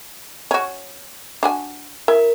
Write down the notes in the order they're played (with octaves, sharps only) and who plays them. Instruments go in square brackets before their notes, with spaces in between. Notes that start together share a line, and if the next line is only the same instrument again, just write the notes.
[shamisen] C#4 F#4
D4 F#4 G#5
[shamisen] E4 [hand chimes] A#4